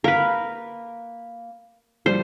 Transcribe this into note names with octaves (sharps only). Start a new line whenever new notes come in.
A#3 A#4 B4 F5
F3 G3 C5